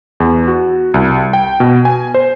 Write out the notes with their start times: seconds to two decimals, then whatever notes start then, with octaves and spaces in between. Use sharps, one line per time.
0.20 E2
0.47 F#4
0.94 C2
1.33 G5
1.60 B2
1.85 G#5
2.14 C5